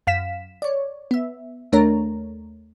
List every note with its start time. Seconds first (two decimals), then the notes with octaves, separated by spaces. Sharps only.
0.07 F#2 F5 B6 E7
0.62 C#5 D5
1.11 B3 E5
1.72 D#2 A3 D4 A#4 C#5 A#5